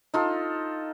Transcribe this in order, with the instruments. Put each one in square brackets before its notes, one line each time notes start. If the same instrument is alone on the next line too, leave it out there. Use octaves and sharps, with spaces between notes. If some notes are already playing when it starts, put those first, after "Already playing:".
[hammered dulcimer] D#4 F4 A4